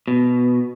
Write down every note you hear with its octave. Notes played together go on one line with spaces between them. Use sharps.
B2